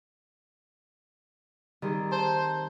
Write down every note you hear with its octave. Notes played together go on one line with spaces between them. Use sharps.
D#3 G3 C4 G#4
C5 A5